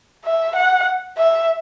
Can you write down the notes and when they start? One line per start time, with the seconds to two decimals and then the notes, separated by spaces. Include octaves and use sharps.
0.25 E5
0.56 F#5
1.18 E5